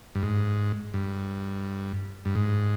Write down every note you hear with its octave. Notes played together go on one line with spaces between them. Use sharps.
G2
G#2
G2
G2
G#2